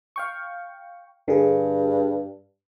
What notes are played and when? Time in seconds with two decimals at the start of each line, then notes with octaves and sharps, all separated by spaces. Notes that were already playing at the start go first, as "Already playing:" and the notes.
0.16 F5 G5 C#6
1.28 G2 D3 G#4